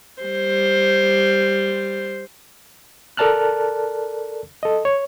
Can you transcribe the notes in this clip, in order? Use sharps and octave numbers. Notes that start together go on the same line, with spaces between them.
G3 C5
A4 A#4 D5 A5 F6 F#6
A4 D#5
C#5